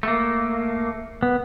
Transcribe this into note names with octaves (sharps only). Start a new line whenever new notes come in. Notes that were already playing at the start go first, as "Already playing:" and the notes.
A3 A#3
B3